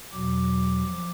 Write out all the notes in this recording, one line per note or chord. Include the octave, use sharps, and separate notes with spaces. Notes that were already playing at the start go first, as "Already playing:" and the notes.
E2 B2 F#3 D6
F3